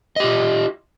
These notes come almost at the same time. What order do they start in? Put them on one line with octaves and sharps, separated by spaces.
D#5 G4 F4